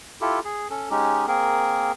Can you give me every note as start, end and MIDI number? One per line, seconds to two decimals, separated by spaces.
0.21 0.40 64
0.21 0.40 65
0.21 0.40 67
0.21 0.40 69
0.45 0.68 68
0.70 0.89 61
0.70 0.89 69
0.90 1.26 56
0.90 1.26 61
0.90 1.26 63
0.90 1.26 67
1.27 1.92 58
1.27 1.92 60
1.27 1.92 68
1.27 1.92 70